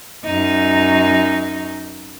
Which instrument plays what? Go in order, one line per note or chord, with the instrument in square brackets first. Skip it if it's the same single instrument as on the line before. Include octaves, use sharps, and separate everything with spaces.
[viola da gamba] F#2 D#4